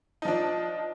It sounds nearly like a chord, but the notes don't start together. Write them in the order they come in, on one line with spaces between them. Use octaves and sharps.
D#4 F3 D4